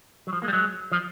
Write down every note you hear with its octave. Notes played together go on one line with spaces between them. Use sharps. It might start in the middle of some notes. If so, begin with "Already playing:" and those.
F#3
F3
G#3 A#3
G3
F#3 G#3
F3